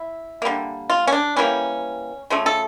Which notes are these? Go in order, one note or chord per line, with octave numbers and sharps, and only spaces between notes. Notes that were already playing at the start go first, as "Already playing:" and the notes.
Already playing: E4
D3 G3 A#3
F4
C#4
D4
E3 G3 A#3 C#4
C#3 F3 A3
A4